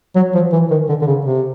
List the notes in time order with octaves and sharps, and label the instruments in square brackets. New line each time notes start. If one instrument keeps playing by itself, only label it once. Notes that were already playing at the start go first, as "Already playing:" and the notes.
[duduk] F#3
F3
E3
D#3
D3
D3
C#3
C3